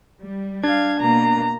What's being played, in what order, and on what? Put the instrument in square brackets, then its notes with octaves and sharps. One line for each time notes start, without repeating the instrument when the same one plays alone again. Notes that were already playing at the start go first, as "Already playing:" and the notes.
[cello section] G3
[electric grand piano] D4 [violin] F5 G#6
[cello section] B2 A#3 [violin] A#5